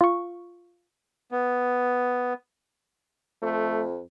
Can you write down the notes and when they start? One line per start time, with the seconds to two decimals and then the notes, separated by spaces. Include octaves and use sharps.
0.01 F4 C#6
1.31 B3
3.42 F2 A3